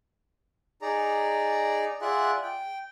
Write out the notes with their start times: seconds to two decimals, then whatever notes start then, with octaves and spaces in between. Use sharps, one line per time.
0.82 D#4 G#4 D5 A#5
2.01 F4 G#4 D5 E5 F#5 F#6
2.42 G5